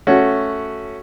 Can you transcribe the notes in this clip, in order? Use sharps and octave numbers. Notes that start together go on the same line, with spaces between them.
A3 C#4 F#4